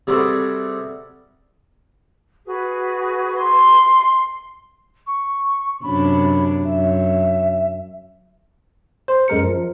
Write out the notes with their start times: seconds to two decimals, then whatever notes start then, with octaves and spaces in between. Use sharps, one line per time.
0.07 C3 G3 F#4 G#4 A4 B4
2.46 F#4 G#4 B4
3.43 C6
5.07 C#6
5.83 F#2 C3 D4 B5
6.65 F#2 E5
9.08 C5
9.28 F#2 G#3 A#4 C#7
9.43 F3